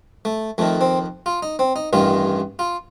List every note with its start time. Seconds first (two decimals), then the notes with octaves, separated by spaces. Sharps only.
0.25 A3
0.58 F2 D#3 A3
0.81 C4
1.26 F4
1.43 D#4
1.59 C4
1.76 D#4
1.93 A1 G2 D#3 F4
2.59 F4